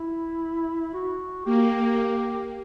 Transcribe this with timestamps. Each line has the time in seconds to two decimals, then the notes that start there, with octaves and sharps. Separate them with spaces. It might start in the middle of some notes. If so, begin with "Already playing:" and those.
Already playing: E4
0.94 F#4
1.45 A#3 G4